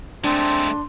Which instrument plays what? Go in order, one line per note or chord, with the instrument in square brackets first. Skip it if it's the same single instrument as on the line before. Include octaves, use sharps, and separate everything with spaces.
[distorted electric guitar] G#3 A3 [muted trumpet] C4 [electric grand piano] D4 [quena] C6